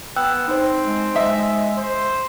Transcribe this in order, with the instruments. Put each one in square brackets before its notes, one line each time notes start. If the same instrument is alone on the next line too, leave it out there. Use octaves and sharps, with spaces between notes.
[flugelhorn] B3 [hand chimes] G5 E6 F#6
[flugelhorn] C4 [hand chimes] D#4 C5
[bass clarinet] G#3
[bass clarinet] G#3 [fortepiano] D#5 E5
[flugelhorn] C5